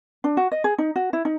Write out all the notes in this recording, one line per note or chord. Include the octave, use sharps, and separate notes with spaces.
D4
F#4
D#5
G#4
D#4
F#4
E4
D#4